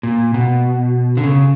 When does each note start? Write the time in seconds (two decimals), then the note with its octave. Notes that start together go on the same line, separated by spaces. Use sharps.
0.03 A#2
0.34 B2
1.17 D3
1.24 C#3